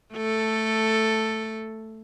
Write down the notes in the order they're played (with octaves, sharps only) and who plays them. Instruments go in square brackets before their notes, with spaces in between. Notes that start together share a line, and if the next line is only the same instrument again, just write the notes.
[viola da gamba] A3 A4